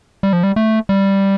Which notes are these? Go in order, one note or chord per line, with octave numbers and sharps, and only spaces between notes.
G3
F3
G3
A3
G3